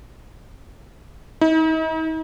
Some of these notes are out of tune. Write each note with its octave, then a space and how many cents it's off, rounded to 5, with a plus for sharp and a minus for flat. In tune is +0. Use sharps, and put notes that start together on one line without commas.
D#4 +45